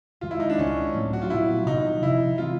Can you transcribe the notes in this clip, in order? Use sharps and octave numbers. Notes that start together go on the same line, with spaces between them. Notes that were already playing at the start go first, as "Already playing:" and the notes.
F#2 D#3 G#3 F4
E4
D#4
D4
C#2 C#3 E3 C#4
G#3
A2 F#3 A3 C4
F#4
F4
A#2 F#3 B3 D4 E4
C3 D#3 F#3 A#3 D#4
D2 C3 F3 E4
E3 G#3 C4 F4